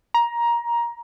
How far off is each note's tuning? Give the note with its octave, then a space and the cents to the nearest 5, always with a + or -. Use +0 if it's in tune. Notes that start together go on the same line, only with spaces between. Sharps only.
A#5 +15